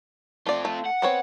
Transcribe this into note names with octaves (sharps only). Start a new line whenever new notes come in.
A3 C4 F4 D5
A3
F#5
B3 C4 C#5